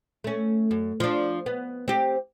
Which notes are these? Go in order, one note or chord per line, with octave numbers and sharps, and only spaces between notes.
A3 C#4
F#2
F3 D4
B3
C4 G4